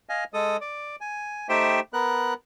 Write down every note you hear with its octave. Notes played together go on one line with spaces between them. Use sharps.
D#5 F5 G#5
G#3 A4 D#6
D5
G#5
A3 D#4 G4 C5 E5 G5
B3 A#4 F#6